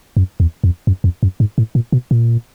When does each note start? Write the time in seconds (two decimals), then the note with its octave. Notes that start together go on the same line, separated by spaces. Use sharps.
0.17 F#2
0.40 E2
0.64 F2
0.87 F#2
1.04 F2
1.23 F#2
1.40 G#2
1.58 A2
1.75 A#2
1.92 B2
2.11 A#2